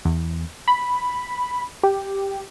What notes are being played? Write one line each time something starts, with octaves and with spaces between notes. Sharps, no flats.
E2
B5
G4